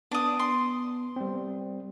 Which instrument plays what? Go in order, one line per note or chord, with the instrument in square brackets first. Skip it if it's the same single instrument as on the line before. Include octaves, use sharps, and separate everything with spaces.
[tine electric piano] B3 [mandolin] D4 D#6
[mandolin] C6
[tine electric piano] G3 C4